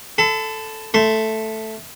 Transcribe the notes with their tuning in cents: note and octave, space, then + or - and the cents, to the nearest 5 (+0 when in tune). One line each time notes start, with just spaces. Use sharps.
A4 +0 B5 +45
A3 +0 C6 +0